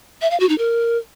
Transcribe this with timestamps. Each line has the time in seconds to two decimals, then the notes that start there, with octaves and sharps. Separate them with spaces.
0.22 E5
0.31 F5
0.40 F#4
0.49 D#4
0.58 A#4